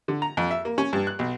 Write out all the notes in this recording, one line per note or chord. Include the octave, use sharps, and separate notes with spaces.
D3
A#5
F2
E5
A#3
C#4
G2
F#6
B1